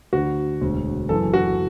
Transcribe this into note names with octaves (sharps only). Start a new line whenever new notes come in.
D2 D3 F#4
E1 D2 D3
F#1 F#2 E3 A4
F#4